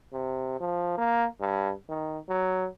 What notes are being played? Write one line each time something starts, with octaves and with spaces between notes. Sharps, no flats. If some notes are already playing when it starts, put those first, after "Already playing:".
C3
F3
A#3
G2
D#3
F#3